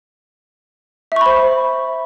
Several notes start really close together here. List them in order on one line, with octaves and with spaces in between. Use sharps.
E5 C#6 B5 C5